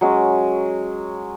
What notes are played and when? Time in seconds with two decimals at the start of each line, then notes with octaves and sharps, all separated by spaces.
0.01 F#3 G#3 C#4